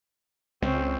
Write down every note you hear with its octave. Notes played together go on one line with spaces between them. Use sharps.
C#2 C4 C#4